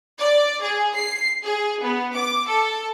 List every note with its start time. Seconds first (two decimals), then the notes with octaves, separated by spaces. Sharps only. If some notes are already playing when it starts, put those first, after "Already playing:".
0.19 D5
0.61 G#4
0.94 C7
1.45 G#4
1.83 B3
2.15 D6
2.47 A4